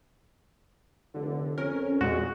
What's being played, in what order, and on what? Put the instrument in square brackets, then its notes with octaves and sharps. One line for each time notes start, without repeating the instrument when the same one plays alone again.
[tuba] F1 [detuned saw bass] D3
[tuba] F2 [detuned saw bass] C#4 [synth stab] A#4
[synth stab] E2 A#2 [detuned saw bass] G#3 [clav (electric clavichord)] F#4